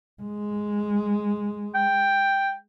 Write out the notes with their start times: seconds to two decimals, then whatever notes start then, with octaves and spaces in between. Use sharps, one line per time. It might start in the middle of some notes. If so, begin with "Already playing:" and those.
0.22 G#3
1.75 G5